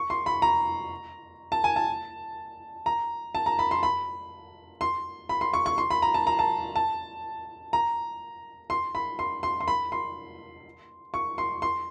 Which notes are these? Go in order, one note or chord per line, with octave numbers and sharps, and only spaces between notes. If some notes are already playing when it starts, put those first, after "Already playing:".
Already playing: C#6
C6
B5
A#5
A5
G#5
A5
A#5
A5
A#5
B5
C6
B5
C6
B5
C6
C#6
C#6
C6
B5
A#5
A5
A#5
A5
A5
A#5
C6
B5
C6
C6
C6
B5
C6
C#6
C6
C6